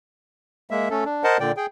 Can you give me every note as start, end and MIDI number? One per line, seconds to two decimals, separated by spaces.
0.71 0.89 56
0.71 0.89 58
0.71 0.89 76
0.90 1.04 57
0.90 1.04 61
0.90 1.04 69
1.05 1.24 62
1.24 1.38 70
1.24 1.38 72
1.24 1.38 75
1.24 1.38 78
1.24 1.38 81
1.40 1.52 46
1.40 1.52 50
1.40 1.52 74
1.40 1.52 79
1.57 1.66 68
1.57 1.66 79